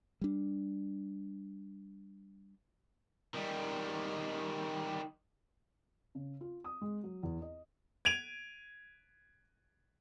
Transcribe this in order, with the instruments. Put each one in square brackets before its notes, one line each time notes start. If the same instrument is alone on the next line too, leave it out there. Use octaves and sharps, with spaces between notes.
[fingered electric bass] G3 D4
[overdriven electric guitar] D#3 G3
[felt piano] C#3
F4
D#6
G#3
F#3
E2
D#5
[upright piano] G#6 D7 D#7 F7